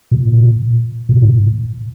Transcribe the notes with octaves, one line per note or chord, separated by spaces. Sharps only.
A#2
A#2
A2